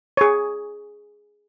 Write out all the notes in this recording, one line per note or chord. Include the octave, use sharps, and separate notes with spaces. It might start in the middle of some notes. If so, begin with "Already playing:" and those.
G#4 C#5